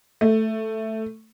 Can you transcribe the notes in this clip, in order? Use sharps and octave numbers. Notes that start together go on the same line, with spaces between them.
A3